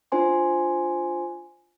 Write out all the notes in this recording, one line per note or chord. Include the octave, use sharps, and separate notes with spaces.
D4 F4 C5 G#5 C6